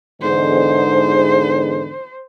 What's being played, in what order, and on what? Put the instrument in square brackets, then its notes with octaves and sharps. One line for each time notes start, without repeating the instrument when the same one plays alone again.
[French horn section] E2 G#2 D3 [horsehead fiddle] C5